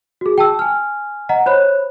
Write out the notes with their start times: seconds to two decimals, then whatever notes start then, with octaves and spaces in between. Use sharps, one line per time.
0.21 F#4 G#4
0.38 G5 A5 E6
0.59 G#5 F6
1.29 D#5 F#5 A#5
1.46 C5 C#5 B5 F#6